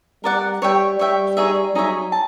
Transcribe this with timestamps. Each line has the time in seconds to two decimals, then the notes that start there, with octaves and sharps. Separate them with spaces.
0.24 G3 A#4 D5 F#5
0.62 G3 C#5 E5 G5
0.99 G3 C#5 E5 G5
1.37 D#4 G#4 C#5 E5
1.74 F#3 D#4 G#4 C#5 E5
2.12 A5